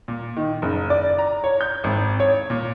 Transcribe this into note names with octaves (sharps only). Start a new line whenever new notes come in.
A#2
D#3
F#1
D5
A#5
C#5
G6
G#1
C#5
A#2